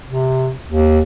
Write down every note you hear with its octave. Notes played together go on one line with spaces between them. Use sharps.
C3
D#2